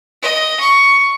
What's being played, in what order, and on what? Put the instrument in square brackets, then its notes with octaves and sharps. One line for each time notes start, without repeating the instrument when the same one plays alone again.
[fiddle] D#5
C#6